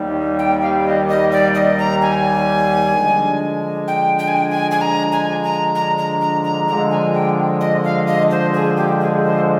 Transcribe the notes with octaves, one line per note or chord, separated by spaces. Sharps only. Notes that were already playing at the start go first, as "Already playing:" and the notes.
Already playing: D#2 D#3 G3
G5
F5
D#5
D#5
D5
D#5
A#5
G#5
D3 F3 G#3 D4
G5
G5
G#5
G5
G#5
G#5
A#5
G#5
A#5
A#5
A#5
A#5
A#5
D3 F3 G#3 A#5
G#5
G5
D#5
F5
D#5
C5
G#4
G4
G#4
C5